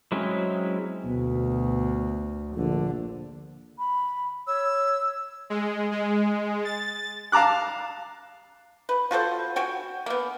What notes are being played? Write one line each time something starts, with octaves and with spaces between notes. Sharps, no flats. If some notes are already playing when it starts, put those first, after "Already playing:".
F#3 G#3 C4 C#4 E4
D2 B2
A#1 D3
B5
C#5 E6
G#3
G#3
A6
F5 A5 A#5 D6 F#6
B4
F4 F#4 A4 C5
F#4 G5 G#5
A#3 B3